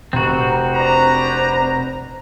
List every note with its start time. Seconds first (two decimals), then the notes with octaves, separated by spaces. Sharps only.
0.13 F1 C4 F#4 A#5
0.75 D4 B4 C5 A#5